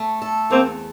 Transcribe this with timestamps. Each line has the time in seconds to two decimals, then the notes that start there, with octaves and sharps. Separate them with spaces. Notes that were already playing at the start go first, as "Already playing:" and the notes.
Already playing: A3
0.22 A4
0.51 E2 A#3 C4